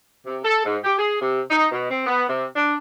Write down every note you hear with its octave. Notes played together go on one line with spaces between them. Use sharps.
C3
A4
G#2
G4
G#4
C3
D#4
B2
C4
B3
C3
D4